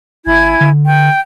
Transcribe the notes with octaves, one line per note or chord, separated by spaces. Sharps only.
G#1 E4 G#5 G#6
D3
G5